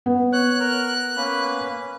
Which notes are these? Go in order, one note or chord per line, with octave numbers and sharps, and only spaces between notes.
B3
C#5 F#6
A#4 F6
A#3 C#4 B4